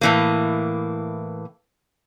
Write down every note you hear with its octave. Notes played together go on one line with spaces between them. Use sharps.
A2 E3 A#3